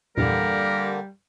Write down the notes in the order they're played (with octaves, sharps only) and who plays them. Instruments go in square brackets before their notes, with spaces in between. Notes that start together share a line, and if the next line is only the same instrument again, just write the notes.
[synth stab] A#1 E2 G2 [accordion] D3 A#3 [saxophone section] G3 [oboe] A#4